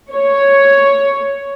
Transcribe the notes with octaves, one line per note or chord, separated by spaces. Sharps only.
C#5